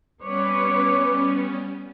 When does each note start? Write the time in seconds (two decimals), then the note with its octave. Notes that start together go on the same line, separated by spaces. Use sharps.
0.22 G3 B3 C#4 B4 C#5 D6